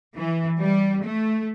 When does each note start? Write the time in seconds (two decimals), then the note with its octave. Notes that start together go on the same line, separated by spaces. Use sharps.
0.15 E3
0.58 G3
1.03 A3